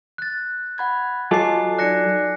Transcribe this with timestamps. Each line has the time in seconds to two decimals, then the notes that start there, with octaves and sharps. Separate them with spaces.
0.18 F#6 A6
0.78 F#5 B5 G#6
1.31 F#3 F4 A4 D#5 G#5 D6 C7
1.79 D#4 D5 F#6 A#6 C#7